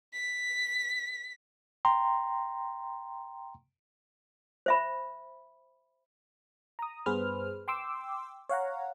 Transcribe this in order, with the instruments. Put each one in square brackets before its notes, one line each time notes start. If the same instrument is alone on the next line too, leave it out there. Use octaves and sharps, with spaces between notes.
[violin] B6
[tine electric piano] G5 A#5 C6
[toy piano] C5 E5 B5
[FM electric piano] A#5 D#6
G2 B3 G#4 B4 C5 F6
G5 C6 D6 E6
C#5 F5 F#5 A#5